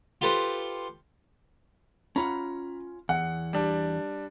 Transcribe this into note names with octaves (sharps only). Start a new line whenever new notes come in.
F4 G4 A4 B4 C5
C#4 F4 F#5 A#5 B5
E2 F#5
G3 D4